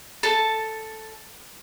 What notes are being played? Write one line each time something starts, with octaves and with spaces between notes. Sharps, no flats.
A4 A5